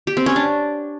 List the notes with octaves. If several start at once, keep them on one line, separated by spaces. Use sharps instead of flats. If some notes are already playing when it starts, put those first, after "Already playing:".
G4
C4
C#4
D4